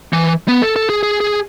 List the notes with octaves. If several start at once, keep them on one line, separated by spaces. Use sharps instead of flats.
E3
B3
A4
A4
G#4
G#4
G#4